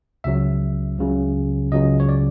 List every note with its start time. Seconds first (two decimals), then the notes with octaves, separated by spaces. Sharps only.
0.24 C#2 C#3 F#3 E5
0.98 C#2 C#3 F#3
1.72 C#2 C#3 F#3 D#5
2.00 C#5
2.09 D5